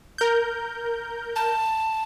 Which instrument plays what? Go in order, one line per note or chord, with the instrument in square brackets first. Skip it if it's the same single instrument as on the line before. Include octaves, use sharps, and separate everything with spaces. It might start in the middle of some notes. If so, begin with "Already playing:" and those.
[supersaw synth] A#4 G6
[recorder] A5